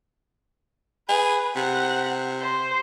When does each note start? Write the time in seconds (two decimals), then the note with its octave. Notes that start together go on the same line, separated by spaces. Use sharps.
1.09 G#4 B4
1.56 C3 F#5
2.40 C5